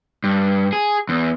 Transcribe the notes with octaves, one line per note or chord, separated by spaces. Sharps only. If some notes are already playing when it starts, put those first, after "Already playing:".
G2
G#4
E2